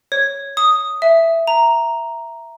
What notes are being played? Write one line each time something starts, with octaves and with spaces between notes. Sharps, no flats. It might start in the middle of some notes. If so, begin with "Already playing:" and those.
C#5
D#6
E5
A#5